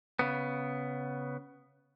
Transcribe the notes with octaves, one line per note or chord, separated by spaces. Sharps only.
C#3 B3